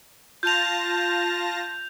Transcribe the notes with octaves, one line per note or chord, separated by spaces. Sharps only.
F4 A5 G6 A#6 F7